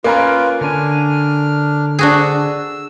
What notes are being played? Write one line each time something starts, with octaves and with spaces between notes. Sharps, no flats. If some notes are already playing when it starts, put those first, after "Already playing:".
A#3 C#4 F4 A#4 B4
D3 D4 G#5 F6
D4 F#4 G#4 E6